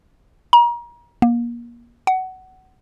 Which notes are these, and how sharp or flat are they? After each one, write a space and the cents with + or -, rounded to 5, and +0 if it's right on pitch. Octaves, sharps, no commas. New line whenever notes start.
A#5 +35
A#3 +30
F#5 +20